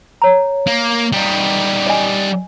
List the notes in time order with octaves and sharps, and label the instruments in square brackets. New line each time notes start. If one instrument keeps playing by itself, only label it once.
[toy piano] C#5 A#5
[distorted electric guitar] A#3
G3 D#4
[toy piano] D#5 G#5